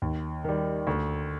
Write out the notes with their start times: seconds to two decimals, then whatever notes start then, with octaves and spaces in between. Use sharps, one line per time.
0.02 D#2
0.44 D#3 G3
0.87 D2